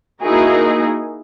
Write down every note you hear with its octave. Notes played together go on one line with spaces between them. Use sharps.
A#3 D#4 E4 F#4 G#4 A#4